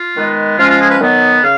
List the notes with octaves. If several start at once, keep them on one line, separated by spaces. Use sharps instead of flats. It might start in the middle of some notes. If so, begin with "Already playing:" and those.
Already playing: F4
D#3 G#3 B3
F3 G#3 C#4 F4
F4
G#4
B4
D#3 F#3 B3
C#3 F5